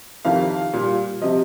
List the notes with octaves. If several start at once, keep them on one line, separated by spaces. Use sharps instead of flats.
F2 C3 D#3 F5
A#2 G3
C3 F3 D#5